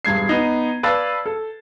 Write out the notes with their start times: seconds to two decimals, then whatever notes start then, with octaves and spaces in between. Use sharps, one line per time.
0.05 E1 G2 G#6 C7
0.29 B3 D#4
0.83 B4 D5 F5 A5 E6 A6
1.26 A4